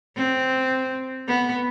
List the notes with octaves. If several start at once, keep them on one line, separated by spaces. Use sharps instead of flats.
C4
B3